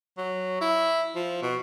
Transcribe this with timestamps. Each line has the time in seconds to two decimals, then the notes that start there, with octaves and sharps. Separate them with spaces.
0.17 F#3
0.61 E4
1.15 F3
1.42 B2